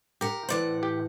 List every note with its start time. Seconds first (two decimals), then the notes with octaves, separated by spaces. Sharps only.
0.21 G4 A#4 F#5
0.49 A2 E3 C5 D5 F#5
0.83 G4 G5